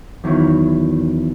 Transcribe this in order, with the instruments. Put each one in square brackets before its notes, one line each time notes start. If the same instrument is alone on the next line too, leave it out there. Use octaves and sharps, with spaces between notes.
[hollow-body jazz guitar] E2 D#3 F#3 E4